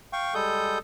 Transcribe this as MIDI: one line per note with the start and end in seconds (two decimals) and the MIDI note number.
0.13 0.34 77
0.13 0.34 79
0.13 0.34 85
0.34 0.78 55
0.34 0.78 56
0.34 0.78 69
0.34 0.78 87
0.34 0.78 91